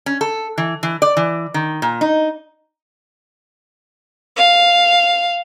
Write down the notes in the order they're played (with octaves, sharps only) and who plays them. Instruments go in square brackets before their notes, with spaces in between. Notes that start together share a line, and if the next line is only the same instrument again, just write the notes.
[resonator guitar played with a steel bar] C#4
A4
E3
E3
D5
E3
D#3
A#2
D#4
[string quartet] F5